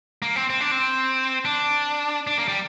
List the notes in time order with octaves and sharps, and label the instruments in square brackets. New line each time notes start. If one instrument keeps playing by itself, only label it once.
[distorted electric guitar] A#3
C4
C4
D4
C4
D4
D4
A#3
G3